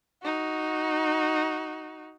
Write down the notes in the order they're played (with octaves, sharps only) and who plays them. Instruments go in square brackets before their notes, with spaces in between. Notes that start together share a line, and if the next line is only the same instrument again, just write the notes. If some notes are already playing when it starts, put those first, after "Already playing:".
[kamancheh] D#4 F#4